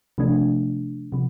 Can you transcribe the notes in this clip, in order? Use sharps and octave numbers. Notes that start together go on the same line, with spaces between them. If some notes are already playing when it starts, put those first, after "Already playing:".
C3 F3 A3 D4
C3 F3